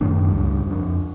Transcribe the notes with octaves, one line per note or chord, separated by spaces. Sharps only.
F#2 A2 D#3 D4
C#2 G2
F2 D4